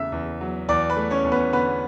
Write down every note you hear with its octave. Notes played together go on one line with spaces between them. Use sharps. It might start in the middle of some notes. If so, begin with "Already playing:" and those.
Already playing: E2 C#3 A3 E5 E6
E2
F#3
E2 D5 D6
B4 B5
A3
C#4 C#5
E2
B3 B4
D3 B3 B4